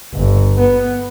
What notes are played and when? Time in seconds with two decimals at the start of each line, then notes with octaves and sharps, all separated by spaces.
0.14 G1
0.59 B3